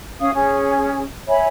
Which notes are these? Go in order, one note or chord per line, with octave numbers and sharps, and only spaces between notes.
C#4 F5 D#6
C#4 G#4
C#5 E5 G#5 B5